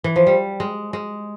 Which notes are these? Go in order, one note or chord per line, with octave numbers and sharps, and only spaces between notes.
E3
F3
G3
G#3
G#3